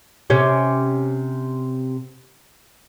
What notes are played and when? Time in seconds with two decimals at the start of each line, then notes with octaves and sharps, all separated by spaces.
0.30 C3 C#4 G4